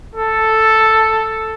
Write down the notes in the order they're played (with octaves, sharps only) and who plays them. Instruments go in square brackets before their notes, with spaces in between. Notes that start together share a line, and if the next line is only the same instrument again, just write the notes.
[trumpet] A4